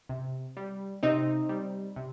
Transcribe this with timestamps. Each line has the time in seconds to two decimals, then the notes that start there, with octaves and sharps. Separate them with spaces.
0.09 C3
0.57 G3
1.03 C3 C4 D#4
1.49 G3
1.96 C3